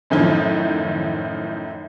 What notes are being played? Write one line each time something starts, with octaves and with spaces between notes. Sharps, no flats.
F#2 A2 D#3 F3